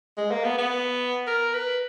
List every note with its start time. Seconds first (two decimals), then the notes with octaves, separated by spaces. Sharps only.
0.17 G#3
0.31 A#3
0.45 B3
0.58 B3
1.27 A#4
1.54 B4